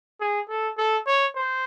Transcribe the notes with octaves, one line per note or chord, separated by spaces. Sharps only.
G#4
A4
A4
C#5
C5